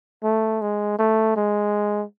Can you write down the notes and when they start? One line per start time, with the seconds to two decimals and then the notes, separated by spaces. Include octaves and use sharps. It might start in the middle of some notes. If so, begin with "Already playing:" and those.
0.24 A3
0.61 G#3
0.99 A3
1.36 G#3